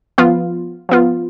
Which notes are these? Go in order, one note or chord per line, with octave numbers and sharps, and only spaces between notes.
F3 B3 F4
F3 B3 F4